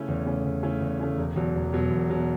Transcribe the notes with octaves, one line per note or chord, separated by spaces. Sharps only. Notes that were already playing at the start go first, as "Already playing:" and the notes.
Already playing: C#3 A3 C#4 E4
E2
C#3 A3 C#4 E4
E2
C#3 A3 C#4 E4
E2
C#3 A3 C#4 E4
E1
E2 B2 F#3
E1
E2 B2 F#3
E1
E2 B2 F#3